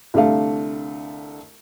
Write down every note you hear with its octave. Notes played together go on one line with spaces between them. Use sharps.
C2 D3 A3 F5